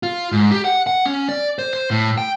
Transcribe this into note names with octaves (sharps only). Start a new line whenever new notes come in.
F4
G#2
G4
F#5
F#5
C#4
D5
C5
C5
A2
G5